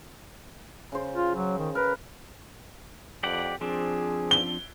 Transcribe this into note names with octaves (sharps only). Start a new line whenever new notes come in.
C#3 C5
F4
F#3
D#3
A#4 B4
F2 G4 D5 F#5
F3 C4 D4 G#4
G7